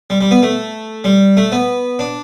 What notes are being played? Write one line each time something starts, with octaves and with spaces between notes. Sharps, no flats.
G3
G3
B3
A3
G3
A3
B3
D4